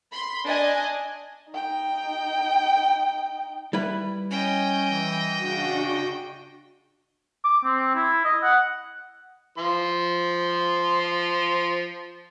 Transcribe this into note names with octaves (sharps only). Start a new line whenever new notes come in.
B5 C6
D4 D5 D#5 G#5
D#4 G5
G3 E4 B4
C#4 D#5 G5
E3
C#3 D4 F#4
D6
C4
E4
D#5
F#5
F3 C6